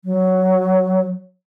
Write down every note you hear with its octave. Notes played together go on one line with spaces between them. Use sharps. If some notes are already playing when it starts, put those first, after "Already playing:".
F#3